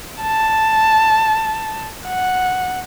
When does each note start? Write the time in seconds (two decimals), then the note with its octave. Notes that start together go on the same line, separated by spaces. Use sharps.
0.22 A5
2.06 F#5